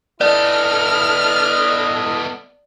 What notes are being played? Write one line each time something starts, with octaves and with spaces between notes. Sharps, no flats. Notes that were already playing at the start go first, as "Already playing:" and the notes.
B3 E4 A4 D5 D#5 F6